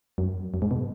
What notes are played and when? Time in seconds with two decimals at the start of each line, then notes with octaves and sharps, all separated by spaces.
0.18 F#2
0.54 F#2
0.62 G#2
0.71 B2